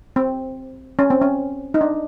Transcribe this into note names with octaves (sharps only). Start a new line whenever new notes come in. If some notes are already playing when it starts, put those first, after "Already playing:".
C4
C#4
C4
C#4
D#4
D4